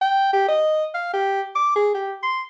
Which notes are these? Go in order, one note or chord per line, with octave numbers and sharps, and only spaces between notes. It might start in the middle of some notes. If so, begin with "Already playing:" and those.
G5
G4
D#5
F5
G4
D6
G#4
G4
C6